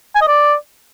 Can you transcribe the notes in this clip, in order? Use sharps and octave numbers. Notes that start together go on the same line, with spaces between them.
G#5
D#5
D5